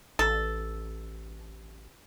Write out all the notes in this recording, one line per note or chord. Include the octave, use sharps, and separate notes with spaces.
A1 A4